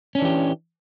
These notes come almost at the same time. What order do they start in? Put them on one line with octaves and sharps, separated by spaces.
C#4 D4 E3 G4